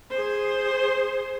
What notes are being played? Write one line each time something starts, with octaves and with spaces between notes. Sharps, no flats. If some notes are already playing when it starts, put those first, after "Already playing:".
G#4 C5